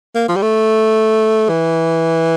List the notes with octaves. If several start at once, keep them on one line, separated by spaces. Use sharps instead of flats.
A#3
F3
G3
A3
E3